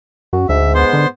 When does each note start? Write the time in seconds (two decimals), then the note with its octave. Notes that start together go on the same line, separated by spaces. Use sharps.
0.33 F#2 F#4
0.49 D2 G#2 E5
0.75 B3 C5 C6
0.93 D3